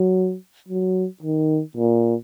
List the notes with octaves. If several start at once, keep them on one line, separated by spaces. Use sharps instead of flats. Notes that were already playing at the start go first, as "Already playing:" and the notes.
Already playing: F#3
F#3
D#3
A#2